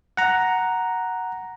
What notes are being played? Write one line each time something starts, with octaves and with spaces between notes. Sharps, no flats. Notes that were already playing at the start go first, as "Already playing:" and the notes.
F#5 A#5